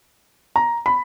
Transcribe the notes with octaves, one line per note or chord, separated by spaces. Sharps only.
A#5
B5